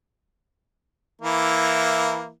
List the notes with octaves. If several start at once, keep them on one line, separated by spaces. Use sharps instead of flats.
E3 A#3 E4